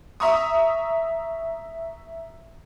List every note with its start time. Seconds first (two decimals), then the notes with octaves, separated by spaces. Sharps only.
0.20 E5 A#5 C#6 D#6